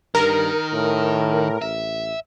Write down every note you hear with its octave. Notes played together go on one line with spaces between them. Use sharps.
G2 D#3 A#4
A2
A1 E5